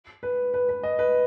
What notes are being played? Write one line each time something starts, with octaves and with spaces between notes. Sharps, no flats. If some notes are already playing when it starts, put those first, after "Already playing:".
B4
B4
B4
D#5
B4